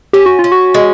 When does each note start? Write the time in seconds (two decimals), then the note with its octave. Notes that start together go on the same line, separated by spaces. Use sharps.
0.13 C#4 G4
0.26 F#4
0.39 F4
0.44 C#4
0.52 F#4
0.74 G#3